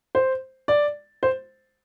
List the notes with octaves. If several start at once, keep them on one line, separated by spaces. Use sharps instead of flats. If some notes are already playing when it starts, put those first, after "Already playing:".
C5
D5
C5